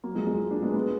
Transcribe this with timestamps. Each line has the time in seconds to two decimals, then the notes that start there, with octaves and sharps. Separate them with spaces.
0.04 F#3 A#3
0.15 F3 G#3
0.27 F3 G#3
0.51 A#3 D4
0.62 G#3 B3
0.74 G#3 B3